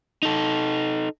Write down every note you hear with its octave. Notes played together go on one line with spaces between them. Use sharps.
D#4 A4